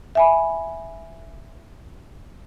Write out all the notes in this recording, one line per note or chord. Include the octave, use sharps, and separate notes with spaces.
E5 G#5 B5